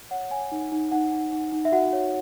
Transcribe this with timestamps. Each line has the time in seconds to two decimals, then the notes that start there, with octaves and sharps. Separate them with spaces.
0.11 C#5 F#5
0.31 C#5 G#5
0.52 D#4
0.72 D#4
0.92 D#4 F#5
1.12 D#4
1.32 D#4
1.52 D#4
1.65 E5
1.72 F#4 F#5
1.93 C#5